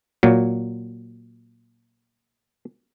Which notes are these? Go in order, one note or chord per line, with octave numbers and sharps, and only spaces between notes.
A#2 F#3